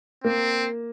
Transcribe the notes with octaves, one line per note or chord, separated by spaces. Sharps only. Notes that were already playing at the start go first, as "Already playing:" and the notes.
A#3 C4